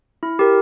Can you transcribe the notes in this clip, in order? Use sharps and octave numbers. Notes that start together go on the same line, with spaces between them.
E4
G4 A#4